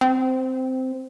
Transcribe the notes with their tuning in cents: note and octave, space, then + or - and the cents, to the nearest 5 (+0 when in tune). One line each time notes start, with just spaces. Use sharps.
C4 -10